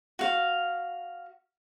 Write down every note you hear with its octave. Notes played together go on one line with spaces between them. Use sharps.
F#4 F5